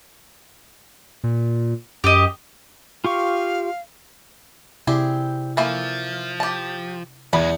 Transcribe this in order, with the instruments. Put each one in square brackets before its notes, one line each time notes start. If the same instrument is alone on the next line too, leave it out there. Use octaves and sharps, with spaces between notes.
[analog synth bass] A#2
[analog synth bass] F#2 [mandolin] G4 D#5
[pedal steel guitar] F4 G4 C#6 [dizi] F5
[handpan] C3 E4 D5 [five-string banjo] C4 G4 G#4
[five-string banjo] E3 A#3 A4 [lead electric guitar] F3
[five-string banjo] G4 A5
[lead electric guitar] B1 G#3 [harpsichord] E2 [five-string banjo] B5